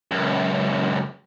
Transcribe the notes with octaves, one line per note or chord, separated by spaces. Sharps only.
C#2 F#2